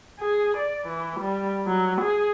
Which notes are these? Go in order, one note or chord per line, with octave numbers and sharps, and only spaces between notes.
G#4
D5
E3
G3
F#3
G#4